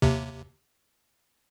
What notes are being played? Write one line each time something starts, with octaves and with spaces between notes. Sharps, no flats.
D#2 C3